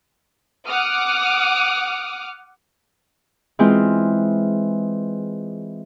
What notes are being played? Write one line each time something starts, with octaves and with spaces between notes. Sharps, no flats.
F#5 D6 D#6 F6
E3 G#3 C4 F4